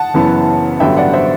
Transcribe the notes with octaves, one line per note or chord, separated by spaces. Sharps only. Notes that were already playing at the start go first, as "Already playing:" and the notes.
Already playing: F#5 A5
F#1 F#2 E3 B3 E4
A1 G2 D3 F#3 B3 E5 G5
D5 F#5
C5 E5